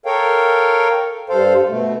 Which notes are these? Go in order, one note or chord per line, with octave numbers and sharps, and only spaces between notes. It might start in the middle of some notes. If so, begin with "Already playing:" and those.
A4 A#4 C#5 F5 G5
G2 A4 C5 F5
B2 A3